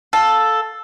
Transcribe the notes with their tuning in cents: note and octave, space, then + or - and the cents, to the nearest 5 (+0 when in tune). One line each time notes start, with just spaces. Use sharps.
A4 +0 F5 +20